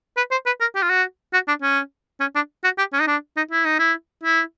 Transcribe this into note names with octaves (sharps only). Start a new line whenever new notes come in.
B4
C5
B4
A#4
G4
F4
F#4
F#4
D4
C#4
C#4
D4
F#4
G4
C#4
D#4
D4
D#4
E4
D#4
E4
E4